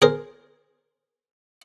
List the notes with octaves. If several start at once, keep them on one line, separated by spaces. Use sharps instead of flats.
G#4 A#4 C5